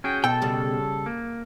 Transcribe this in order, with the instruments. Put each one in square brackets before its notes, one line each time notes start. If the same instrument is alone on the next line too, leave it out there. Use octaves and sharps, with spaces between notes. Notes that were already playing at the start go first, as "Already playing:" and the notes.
[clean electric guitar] C#4 F#4 G#4 [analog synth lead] G5
[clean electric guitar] B2 [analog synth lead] A4 [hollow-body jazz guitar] G5
[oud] C#3 G3
[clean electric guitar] A#3